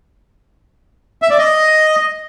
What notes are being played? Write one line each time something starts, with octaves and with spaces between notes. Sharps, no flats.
E5
D5
D#5